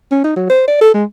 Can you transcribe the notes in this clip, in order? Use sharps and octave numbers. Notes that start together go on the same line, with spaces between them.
C#4
D#4
F#3
C5
D5
A4
G#3